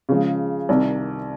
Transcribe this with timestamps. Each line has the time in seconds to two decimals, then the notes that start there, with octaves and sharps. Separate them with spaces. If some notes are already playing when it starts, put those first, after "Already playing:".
0.09 C#3 F3 G#3
0.69 C2 C3 D#3